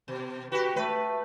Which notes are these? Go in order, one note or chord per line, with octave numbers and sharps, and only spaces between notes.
B2
F#4 G4 B4
A3 B4